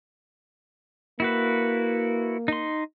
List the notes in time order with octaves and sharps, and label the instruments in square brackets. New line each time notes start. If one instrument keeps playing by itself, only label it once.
[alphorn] A#3 [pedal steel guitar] E4 F#4 B4
[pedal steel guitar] D#4 C6